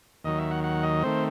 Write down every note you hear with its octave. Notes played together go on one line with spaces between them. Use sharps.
D#2 D#3 F#3 D#5
E5
F#5
F#5
D#5
D#3 A3 C4 C5